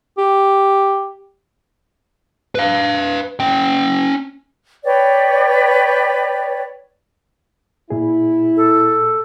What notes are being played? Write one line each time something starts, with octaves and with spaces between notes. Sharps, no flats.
G4
B4 F5
C#4 G5
B4 C#5 D5 G5
A#2 E4 G#4
A4